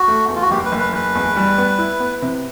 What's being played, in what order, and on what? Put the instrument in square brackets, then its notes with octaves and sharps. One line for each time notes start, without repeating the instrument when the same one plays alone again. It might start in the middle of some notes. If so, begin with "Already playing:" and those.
Already playing: [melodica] F#4
[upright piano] A3
E2
[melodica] F4
F#4
[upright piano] F#1 [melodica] G4
[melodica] B4
[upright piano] F#1
[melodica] B4
[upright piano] F#1 [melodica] B4
[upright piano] E2
G3
B3
E4
B3
C3